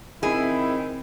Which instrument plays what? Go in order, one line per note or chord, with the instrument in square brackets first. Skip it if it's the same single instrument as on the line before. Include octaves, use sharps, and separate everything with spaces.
[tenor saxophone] D#3 [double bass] C4 [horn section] E4 [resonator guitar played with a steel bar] G#4